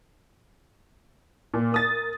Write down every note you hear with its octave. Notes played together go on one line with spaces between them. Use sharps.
A#2
A#4 D#6 A6